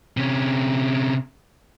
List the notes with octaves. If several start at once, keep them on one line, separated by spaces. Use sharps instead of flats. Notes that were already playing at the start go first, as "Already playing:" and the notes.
C3 C#4